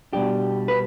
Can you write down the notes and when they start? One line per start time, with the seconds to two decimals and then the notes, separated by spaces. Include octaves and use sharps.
0.13 B2 G3 D4 G4
0.68 B4